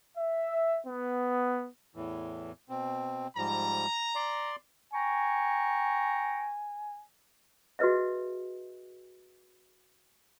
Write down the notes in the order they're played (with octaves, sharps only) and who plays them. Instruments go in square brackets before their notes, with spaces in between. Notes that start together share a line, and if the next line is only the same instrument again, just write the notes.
[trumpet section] E5
B3
[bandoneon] E2 A2 E3
B2 C4
[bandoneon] G#2 F3 G3 [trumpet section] A#5
[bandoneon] D5 C6
[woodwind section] G5 A#5 C#6 [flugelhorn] G#5
[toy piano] F#4 G#4 B4 D#5 E5